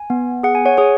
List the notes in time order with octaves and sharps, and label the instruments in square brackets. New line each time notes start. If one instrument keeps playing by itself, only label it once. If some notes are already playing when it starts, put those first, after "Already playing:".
Already playing: [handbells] G#5
B3
G#4 F#5
G#5
C#5 F#5
G#4 C#5